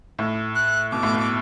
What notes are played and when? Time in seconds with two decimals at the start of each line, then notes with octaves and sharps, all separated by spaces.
0.19 A2
0.55 F#6
0.91 B2 D6
1.03 A2
1.13 B2
1.19 D6